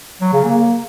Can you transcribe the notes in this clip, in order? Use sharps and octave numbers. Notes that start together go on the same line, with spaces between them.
F#3
C#3
A#3